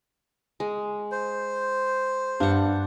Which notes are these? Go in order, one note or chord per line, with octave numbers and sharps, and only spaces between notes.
G#3
C5
G2 D4 F#5